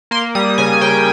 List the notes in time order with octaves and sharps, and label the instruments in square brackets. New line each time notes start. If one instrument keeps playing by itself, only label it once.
[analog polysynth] A#3 C6
G3 D#6
C#3 G#5
C#3 G5